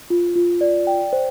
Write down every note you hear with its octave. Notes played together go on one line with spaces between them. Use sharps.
F4
F4
D5
G5
C5